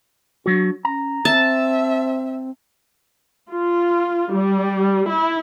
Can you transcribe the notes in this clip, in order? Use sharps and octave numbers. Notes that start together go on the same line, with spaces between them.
F#3 D4 F#4
C#4 A#5
C4 E5 A5
F4
G3
E4